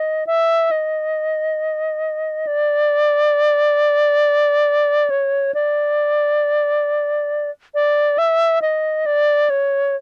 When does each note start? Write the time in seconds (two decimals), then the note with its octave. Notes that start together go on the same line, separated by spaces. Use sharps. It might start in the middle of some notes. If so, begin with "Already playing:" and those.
Already playing: D#5
0.27 E5
0.71 D#5
2.47 D5
5.10 C#5
5.54 D5
7.75 D5
8.18 E5
8.62 D#5
9.06 D5
9.50 C#5